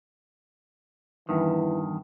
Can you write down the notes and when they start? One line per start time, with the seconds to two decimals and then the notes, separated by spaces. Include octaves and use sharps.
1.29 E2 G2 D#3 E3